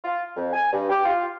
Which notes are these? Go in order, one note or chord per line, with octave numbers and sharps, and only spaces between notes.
F4
F2
G#5
G2
G4
F4